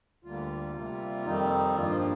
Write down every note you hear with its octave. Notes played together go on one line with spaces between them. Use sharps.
D2 D3 G3 A#3 F4
C3 G3 A#3
F2 D#3 G3 C4 D#4
G2 F3 A#3 F4